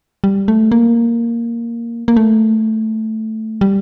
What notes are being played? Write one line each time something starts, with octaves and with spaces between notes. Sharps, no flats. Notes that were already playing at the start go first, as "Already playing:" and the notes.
G3
A3
A#3
A#3
A3
G3